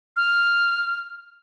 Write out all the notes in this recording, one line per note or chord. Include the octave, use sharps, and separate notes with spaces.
F6